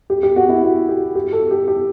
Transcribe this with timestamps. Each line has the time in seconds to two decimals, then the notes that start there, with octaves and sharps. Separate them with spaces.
0.10 G4
0.23 G4
0.36 F#4
0.49 E4
0.63 F#4
0.89 G4
1.15 G4
1.32 A4
1.51 G4
1.68 G4